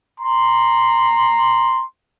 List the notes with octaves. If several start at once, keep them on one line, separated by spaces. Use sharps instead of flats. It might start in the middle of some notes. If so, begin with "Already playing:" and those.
A#5 C6